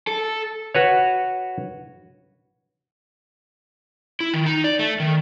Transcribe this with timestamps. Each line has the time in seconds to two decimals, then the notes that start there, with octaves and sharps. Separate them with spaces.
0.07 A4
0.75 F#4 B4 C#5
4.20 E4
4.34 D#3
4.46 D#4
4.64 D5
4.79 A3
5.00 D#3